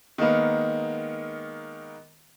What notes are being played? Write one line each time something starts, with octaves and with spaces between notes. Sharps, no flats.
D#3 G#3 A#3 B3